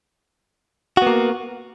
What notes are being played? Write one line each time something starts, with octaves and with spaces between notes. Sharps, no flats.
A#3 B3 F#4